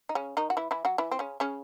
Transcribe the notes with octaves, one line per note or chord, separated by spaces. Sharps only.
D#4
C#3 C#4
D#3 D#4
F#4
E3 E4
E3 E4
F#3 F#4
E3 E4
C4
C#3 C#4
C#3 C#4